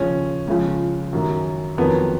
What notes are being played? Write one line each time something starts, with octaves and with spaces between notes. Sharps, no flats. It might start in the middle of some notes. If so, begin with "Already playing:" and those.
Already playing: D#2 C#3 F3 C#4
C#2 C#3 F3
F#2 D#3 F#3
F2 D#3 F#3 B3